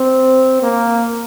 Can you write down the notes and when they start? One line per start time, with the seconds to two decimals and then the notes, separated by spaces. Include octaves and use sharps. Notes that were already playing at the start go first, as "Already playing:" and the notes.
Already playing: C4
0.63 A#3